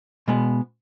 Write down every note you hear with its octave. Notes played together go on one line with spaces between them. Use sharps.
B2 G#3 B3